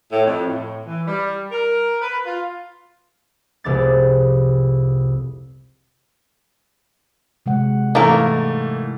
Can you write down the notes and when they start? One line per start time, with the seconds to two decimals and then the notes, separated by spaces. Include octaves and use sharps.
0.12 A2
0.25 F2
0.46 A2
0.86 E3
1.08 G3
1.52 A#4
2.01 B4
2.26 F4
3.64 F1 C2 G#3 B3 D6 A6
7.46 C3 G#3 F#5
7.95 G#2 E3 A3 A#3 A#4